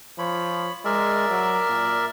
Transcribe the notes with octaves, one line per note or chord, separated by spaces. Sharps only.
F3 C#5 B5
G#3 A#4 D5 E5
F#3
A#2